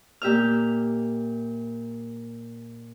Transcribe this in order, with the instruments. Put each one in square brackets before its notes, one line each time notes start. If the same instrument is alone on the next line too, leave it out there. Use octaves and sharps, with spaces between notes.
[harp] A#2 G4 E5 F6